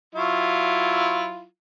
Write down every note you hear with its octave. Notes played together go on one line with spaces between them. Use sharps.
F#3 E4 F4